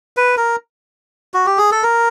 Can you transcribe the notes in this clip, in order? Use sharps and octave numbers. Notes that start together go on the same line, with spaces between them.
B4
A#4
F#4
G4
G#4
A4
A#4